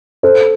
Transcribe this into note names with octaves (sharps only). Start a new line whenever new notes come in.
A4 C5